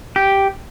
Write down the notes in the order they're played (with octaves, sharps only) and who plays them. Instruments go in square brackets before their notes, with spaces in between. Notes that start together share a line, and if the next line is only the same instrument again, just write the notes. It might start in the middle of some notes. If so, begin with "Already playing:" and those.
[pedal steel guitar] G4